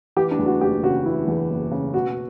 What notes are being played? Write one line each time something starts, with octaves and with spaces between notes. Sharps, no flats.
E3 G4
D4
E2
F#4
F#1 G4
C#3 F#4
E3 E4
E2
F#1
C#3
B2 F#4